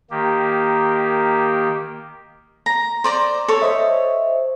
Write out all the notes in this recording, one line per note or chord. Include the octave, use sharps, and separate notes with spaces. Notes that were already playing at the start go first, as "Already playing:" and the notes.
D#3 A#3 G4
A#5
C5 D5 A#5
A4 C#5
C5 D#5 E5